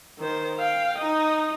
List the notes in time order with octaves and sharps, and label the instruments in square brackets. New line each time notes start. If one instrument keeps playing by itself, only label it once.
[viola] D#3 C5
F5 G5
D#4 D#5